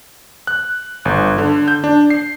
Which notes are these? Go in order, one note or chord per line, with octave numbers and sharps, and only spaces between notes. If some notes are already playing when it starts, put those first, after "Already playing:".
F#6
G1
D3
G6
D4
C7